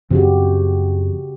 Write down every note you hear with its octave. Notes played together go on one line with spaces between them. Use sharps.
F#2 C#3 F3 C4 F#4 G4